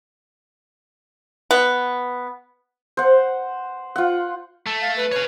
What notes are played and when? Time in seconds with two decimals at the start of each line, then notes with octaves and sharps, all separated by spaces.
1.51 B3
2.97 C5 F#5
3.96 F4 F#5
4.66 A3
4.81 F5
4.97 B4
5.12 B4 C#5 F5